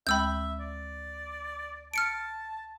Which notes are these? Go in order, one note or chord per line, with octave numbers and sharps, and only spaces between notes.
D2 G#3 E5 G5 B5 E6 G6
D5
A5 F6 C#7 D7